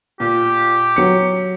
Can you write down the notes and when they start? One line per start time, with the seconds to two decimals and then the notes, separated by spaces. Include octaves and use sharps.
0.20 A#2 G4
0.96 F#3 C#7